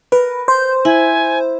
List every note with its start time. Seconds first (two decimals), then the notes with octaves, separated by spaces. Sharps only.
0.12 A#4 B4
0.48 C5 G6
0.85 E4 G#5